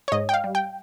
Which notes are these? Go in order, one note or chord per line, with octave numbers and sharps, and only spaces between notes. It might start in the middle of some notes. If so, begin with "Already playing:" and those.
C#5
G#2 D#5
G5
F5
G3
G5